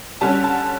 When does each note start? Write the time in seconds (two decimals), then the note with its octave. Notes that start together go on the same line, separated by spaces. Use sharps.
0.21 D3 G3 C#4 A5
0.44 A5